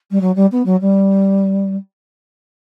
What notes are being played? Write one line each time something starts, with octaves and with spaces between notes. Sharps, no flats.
G3
F#3
G3
B3
F#3
G3